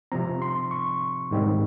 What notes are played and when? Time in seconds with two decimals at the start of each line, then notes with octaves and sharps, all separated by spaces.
0.12 C3 F3 C4 A#5
0.42 C6
0.71 C#6
1.31 G#2 D#3 G3 C4